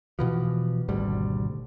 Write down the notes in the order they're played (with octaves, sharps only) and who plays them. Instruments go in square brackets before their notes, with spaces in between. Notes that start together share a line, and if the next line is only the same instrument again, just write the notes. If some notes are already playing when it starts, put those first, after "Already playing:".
[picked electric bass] B2 E3 F3
G#1 D2 B2 G3